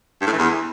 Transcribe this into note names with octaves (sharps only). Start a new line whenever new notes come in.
G2
A2
E3
E2